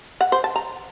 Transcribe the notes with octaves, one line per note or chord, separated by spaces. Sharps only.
F#5
C5
A5
A#5